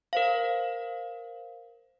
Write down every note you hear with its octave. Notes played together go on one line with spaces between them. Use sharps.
A#4 C5 F5